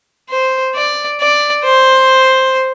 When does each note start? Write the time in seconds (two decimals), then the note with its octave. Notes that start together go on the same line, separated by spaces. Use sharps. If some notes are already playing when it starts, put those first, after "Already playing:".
0.30 C5
0.75 D5
1.20 D5
1.64 C5